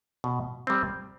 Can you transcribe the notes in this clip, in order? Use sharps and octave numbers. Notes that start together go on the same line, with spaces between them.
B2
G3 C4